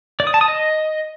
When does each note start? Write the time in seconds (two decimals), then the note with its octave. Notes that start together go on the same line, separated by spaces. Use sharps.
0.20 D5
0.27 D#6
0.34 A5
0.41 D#6
0.48 D#5